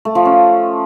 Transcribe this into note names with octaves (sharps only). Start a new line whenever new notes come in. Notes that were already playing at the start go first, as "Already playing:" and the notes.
A3
F3
C#4